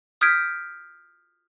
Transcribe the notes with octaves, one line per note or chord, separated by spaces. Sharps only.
D#6 F6 G6 G#6 B6 D7